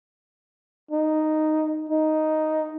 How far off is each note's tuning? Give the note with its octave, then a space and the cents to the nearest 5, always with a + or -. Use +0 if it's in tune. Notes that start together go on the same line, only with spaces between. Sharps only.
D#4 -5
D#4 +0